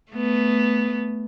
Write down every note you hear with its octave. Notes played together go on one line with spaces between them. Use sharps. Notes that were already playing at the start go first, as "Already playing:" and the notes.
A3 B3